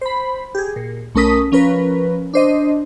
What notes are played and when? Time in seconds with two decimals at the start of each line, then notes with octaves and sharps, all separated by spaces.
0.01 C5 B5
0.55 G4 G#4
0.76 A#2
1.15 B1 A3 C#4 A#4 D#6 B6
1.52 F3 C#4 A#4 B4
2.33 D4 C5 D#5